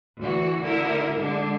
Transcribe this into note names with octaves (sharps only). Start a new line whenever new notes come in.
D2 E3 F#4
D2 D3 E4 A#4 E5
D3 G#3 D4